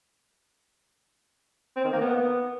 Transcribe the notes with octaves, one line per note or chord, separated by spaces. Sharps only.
C4
D#3
A#3
B3